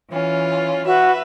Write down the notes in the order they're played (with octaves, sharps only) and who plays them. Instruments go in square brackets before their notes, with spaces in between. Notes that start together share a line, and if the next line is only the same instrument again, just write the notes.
[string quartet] E3 C#4 F4
[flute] F#4 [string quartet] B4 E5